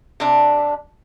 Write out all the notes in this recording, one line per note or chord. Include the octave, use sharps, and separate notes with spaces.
C3 D4